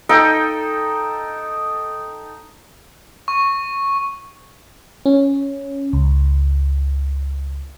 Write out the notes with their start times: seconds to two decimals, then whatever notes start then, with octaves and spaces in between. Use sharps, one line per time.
0.09 D#4 A4 G5
3.28 C#6
5.06 C#4
5.93 C#2